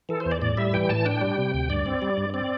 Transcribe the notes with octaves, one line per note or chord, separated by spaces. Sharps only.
E3 A4
C5
E2
D5
A2 D5
G3 E5
E3 G5
A2 A5
D4 G5
G3
C3
D2
G2 D5
C4
G3
G2
C4 D5